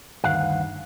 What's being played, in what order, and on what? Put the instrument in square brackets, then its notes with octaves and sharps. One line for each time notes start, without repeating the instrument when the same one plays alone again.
[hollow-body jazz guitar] D2 G2 D#3 [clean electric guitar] F5 F#5